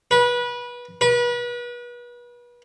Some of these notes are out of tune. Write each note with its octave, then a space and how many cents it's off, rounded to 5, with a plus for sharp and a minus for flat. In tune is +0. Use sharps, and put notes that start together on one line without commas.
B4 -25
B4 -35